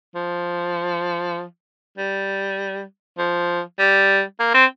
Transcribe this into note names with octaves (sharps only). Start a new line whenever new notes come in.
F3
G3
F3
G3
A#3
C4